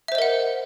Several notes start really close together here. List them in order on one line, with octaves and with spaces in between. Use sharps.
E5 C5 D#5 A#4 F#5